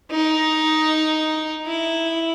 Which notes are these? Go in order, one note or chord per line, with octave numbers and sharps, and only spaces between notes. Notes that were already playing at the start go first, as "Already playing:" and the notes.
D#4
E4